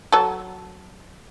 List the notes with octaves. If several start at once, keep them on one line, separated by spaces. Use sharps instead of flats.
F#3 A4